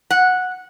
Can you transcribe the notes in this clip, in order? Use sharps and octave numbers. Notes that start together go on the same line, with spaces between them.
F#5